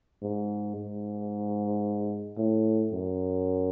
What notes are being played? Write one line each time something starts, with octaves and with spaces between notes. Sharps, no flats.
G#2
G#2
A2
F#2